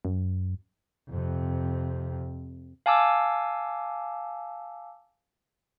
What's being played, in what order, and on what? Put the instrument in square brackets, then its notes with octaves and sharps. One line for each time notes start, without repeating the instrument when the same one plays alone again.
[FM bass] F#2
[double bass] F2 C3
[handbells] F5 G#5 A5 D6 E6